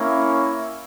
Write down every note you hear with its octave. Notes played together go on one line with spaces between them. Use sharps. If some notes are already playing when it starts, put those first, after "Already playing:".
Already playing: A#3 C#4 E4